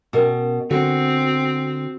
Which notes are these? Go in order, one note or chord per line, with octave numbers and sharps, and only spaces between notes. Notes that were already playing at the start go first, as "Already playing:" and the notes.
B2 C#4 A#4 E6
D3 C4 F#4